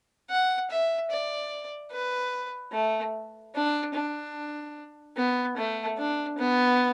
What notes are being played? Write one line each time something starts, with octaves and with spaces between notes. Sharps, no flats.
F#5
E5
D5
B4
A3
D4
D4
B3
A3
D4
B3